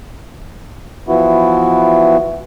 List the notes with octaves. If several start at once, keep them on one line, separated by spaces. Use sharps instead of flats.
E3 F3 B3 E4 F#4